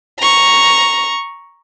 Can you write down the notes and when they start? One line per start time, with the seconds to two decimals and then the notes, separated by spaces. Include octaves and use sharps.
0.19 A#5 C#6